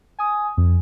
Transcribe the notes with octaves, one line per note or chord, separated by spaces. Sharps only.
G#5 D#6
F2